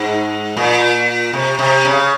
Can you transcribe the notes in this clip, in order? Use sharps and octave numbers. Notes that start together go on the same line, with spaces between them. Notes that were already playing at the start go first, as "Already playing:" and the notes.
Already playing: G#2
A#2
C3
C3
C#3